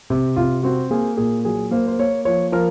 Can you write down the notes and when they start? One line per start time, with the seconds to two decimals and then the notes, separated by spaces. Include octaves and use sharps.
0.10 C3
0.36 C3 F4
0.63 C4 F#4
0.90 A#3 G#4
1.17 A#2 G#4
1.45 F#3 G#4
1.71 A#3 C5
1.87 C5
1.99 A#3 C#5
2.25 F3 C#5
2.52 F3 A#4